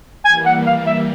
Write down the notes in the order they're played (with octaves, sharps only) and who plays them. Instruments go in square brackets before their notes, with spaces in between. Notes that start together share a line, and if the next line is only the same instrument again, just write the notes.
[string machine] E3 G3 A#3 [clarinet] G#5
[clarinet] F#5
F5
E5